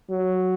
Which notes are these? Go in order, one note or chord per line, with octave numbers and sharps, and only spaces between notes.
F#3